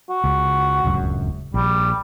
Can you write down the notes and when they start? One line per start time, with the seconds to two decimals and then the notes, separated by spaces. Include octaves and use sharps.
0.10 F#4
0.24 C#2
0.84 D1 C#2 F#2
1.54 A#1 G3